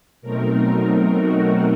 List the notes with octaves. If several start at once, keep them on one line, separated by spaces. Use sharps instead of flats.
B2 F#3 A3 C4 D#4 A#4
F#4